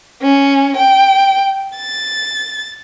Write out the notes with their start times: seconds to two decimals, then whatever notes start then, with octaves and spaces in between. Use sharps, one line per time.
0.22 C#4
0.77 G5
1.77 A6